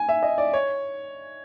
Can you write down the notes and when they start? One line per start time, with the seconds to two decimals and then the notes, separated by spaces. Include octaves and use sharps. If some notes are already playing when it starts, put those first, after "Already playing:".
Already playing: G#5
0.09 E5
0.23 D#5
0.38 D5
0.53 C#5